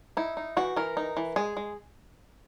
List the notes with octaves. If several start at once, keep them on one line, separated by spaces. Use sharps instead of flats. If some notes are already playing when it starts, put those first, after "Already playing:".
D#4 E4
D#4
E3 F#4
E3 A#4
D#4
E3
G#3 G#4
G#3